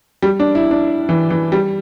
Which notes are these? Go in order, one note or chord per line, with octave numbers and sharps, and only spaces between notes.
G3
D4
E4
D4
E3
E3
G3